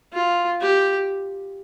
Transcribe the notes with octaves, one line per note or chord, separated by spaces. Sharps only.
F4
G4